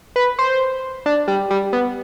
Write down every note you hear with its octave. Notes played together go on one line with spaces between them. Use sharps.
B4
C5
D4
G3
G3
B3